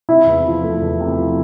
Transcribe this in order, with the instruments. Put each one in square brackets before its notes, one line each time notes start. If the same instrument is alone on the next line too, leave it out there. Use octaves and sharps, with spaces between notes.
[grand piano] C3 [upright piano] E4
[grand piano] E2
F3
A3
E2
C3
F3